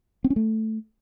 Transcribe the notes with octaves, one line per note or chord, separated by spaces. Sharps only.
C4
C#4
A3